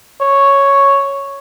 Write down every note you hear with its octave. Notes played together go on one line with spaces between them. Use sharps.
C#5